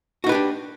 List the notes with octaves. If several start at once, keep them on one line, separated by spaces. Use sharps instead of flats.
D4 D#4 F#4 G4 B4